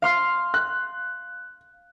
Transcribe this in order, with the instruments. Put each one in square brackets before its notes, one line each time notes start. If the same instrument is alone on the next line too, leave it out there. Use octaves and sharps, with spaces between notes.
[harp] F5 C6 F6
[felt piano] F#6